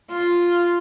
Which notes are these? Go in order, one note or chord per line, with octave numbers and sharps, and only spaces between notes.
F4